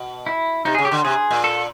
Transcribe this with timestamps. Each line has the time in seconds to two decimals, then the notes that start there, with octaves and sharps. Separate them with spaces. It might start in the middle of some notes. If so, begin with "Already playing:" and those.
Already playing: B2
0.26 E4
0.65 C3 D#4
0.75 G#4
0.79 C#3
0.85 G4
0.92 D3
1.05 C3 G#4
1.31 A#2
1.44 A4